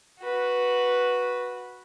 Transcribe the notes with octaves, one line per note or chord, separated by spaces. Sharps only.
F#4 B4